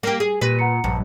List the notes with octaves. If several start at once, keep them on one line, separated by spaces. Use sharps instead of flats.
A#3 G4
G#4
A#2 G4 B4 A#6 D#7
F#5 A#5 C#7
A#1 G2